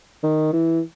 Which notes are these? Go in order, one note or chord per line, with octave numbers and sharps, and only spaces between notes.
D#3
E3